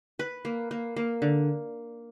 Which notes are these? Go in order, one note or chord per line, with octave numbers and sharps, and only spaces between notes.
B4
A#3
A#3
A#3
D3